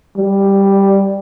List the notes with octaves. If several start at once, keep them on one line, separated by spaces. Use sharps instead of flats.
G3